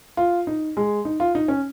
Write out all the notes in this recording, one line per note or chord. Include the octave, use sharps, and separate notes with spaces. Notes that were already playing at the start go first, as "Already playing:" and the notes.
F4
D#4
G#3
D#4
F4
D#4
C#4